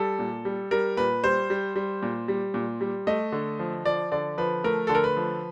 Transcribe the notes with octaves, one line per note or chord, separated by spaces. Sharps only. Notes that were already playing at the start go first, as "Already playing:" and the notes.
Already playing: G3 A4
A#2
G3
G3 A#4
A#2 B4
G3 C5
G3
G3
A#2
G3
A#2
G3
A3 D#5
D3
F3
F3 D5
D3 D5
F3 B4
A3 A#4
D3 A4
A#4
B4
F3